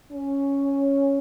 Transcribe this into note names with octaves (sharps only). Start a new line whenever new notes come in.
C#4